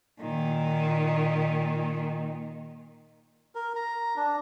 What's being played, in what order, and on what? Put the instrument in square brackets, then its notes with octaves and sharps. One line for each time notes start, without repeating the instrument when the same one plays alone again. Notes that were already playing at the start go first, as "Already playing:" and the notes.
[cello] A#2 D#3
[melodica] A#4
A#5
D4